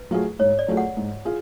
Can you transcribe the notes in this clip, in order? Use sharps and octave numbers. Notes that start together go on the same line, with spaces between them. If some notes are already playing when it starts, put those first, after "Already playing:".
Already playing: B4
F#3 A3 F4 G#4
G#2 C#5
D5
F#3 A3 F4 G#4
F#5
G#2
F4 G#4